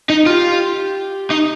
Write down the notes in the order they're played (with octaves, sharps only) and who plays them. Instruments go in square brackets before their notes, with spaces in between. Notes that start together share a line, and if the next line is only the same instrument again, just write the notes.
[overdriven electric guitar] D#4
[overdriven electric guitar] F4 [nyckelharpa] G4
[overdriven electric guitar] D#4